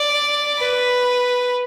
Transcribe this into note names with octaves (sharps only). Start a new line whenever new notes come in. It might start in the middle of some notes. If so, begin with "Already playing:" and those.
Already playing: D5
B4